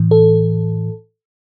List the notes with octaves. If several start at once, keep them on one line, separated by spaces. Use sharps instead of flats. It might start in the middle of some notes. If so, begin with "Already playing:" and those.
Already playing: A2 E3
A4